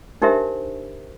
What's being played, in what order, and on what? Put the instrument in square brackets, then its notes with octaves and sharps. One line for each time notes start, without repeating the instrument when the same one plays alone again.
[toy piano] D4 D#4 G4 A#4 C5 E5